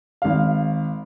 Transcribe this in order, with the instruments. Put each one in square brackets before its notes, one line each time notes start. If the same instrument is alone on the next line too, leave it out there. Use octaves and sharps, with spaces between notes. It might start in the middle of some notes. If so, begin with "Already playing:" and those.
[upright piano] G#1 F5